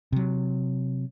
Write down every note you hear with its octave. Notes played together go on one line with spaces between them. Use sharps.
C3 F#3